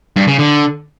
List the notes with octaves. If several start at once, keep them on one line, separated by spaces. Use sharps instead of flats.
G2
C#3
D3